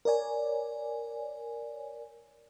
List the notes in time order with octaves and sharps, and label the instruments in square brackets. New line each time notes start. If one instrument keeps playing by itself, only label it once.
[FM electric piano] A#4 C#5 D5 G#5